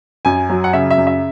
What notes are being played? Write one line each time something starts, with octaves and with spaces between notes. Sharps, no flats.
F#2 G#5
F#3
F#5
C#3 E5
E5
F#2
E5